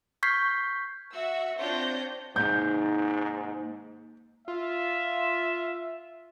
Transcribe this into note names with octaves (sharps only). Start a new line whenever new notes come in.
C#6 F6 G6 G#6 B6 C7
F#4 E5 E6
C4 D4 F4 C#5 G6 A#6
G#2 A#3 D#4 G#4 G6
F4 E5